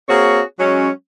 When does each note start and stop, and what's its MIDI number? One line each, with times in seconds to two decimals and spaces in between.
0.08 0.41 58
0.08 0.41 60
0.08 0.41 66
0.08 0.41 68
0.08 0.41 73
0.59 0.89 54
0.59 0.89 56
0.59 0.89 61